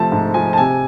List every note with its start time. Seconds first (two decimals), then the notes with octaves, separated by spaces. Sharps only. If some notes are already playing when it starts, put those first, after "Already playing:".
Already playing: C3 F3 A3 A5
0.12 G#2
0.34 F3 G#5
0.53 A5
0.57 C3 G#5